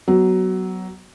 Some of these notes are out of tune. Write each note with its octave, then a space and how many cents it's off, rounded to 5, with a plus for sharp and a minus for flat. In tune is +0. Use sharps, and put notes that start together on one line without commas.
F#3 +15 B3 +0